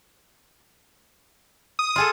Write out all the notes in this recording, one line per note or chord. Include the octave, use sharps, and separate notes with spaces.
D#6
F4 G#4 A4